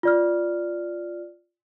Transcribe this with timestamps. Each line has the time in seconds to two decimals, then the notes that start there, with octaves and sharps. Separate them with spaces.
0.03 F4 D5 F6